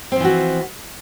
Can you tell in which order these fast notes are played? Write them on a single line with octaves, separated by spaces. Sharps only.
C4 F3 E3 F#4